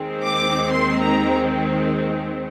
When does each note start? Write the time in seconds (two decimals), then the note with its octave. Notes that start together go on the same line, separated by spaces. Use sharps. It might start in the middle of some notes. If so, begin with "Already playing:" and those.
Already playing: D#2 D#3 G#3 C4
0.23 D6
0.70 C6
1.01 A#5